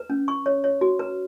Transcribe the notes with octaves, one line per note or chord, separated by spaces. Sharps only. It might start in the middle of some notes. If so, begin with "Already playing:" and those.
Already playing: B4
C#4
C#6
C#5
C#5
F#4
B4